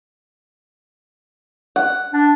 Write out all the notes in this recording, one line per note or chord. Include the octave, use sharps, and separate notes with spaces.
F#5
D4